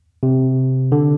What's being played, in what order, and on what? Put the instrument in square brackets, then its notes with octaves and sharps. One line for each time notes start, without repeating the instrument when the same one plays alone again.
[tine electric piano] C3
D3